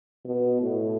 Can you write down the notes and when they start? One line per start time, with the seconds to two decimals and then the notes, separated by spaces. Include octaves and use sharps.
0.25 B2
0.61 A2